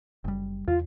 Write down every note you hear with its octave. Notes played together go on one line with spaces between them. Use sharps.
F#1 G3
E2 F4